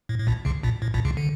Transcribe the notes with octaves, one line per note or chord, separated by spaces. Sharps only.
A2
A2
A#1 A#2
C#2 C#3
A#1 A#2
A2
A#1 A#2
C#2 C#3
D3